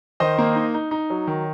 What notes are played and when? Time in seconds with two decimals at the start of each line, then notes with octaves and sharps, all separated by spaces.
0.20 D#3 C5 D#5
0.38 A#3
0.55 D#4
0.74 D#4
0.91 D#4
1.10 F#3
1.27 D#3